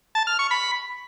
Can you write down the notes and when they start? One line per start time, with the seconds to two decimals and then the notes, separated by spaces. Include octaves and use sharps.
0.15 A5
0.27 F6
0.39 C#6
0.51 B5